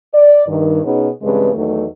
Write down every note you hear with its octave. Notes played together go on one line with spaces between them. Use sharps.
D5
G2 D#3
B2 B3 C#4 D#4 G#4
G2 C#3 E3 G#3 C4 B4
E2 D#3 F#3 A3 D#4